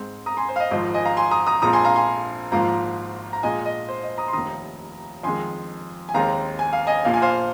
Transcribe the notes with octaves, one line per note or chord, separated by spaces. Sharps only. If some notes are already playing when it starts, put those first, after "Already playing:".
Already playing: G#2 G#3 C4
A#5 D#6
G#5 C6
C5
F5
D#5
G#1 G#2 F3 D#5
D#5 G#5
F5 A#5
G#5 C6
A#5 D#6
A#5 D#6
A#1 A#2 G#3 C4 A#5 D#6
G#5 C6
F5 A#5
G#5 C6
G#1 G#2 F3 A#3 F5 A#5
A#5
A#1 A#2 G#3 D#5 G#5
D#5
C5
D#5
A#5 D#6
C6
F1 D#2 D#3 A#5 D#6
F2 D#3 G#3 G#5 C6
G#5
D#2 D#3 G#3 C4 F5 A#5
G#5
F5
D#5 G#5
A#1 A#2 A#3 F5
G#5
C5 F5